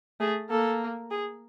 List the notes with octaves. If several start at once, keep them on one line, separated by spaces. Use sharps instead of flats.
A3 G#4
A#3 A4
G#4